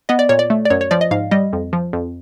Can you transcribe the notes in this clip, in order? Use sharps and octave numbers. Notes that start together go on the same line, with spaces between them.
B3 D#5
D5
A#2 C#5
D5
A3
D5
F#2 C#5
C#5
F3 D5
D#5
G#2 F5
G3 D#5
F2
F3
F2